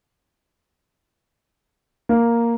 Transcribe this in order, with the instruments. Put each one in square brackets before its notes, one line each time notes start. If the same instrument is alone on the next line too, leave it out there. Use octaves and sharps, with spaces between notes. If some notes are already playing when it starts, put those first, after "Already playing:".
[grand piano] A#3